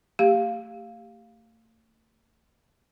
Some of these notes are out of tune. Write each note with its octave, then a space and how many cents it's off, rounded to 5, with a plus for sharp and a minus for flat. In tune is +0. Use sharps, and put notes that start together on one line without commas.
A3 +40 G4 +10 F5 +0